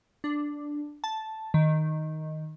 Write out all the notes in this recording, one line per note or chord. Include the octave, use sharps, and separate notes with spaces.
D4
A5
D#3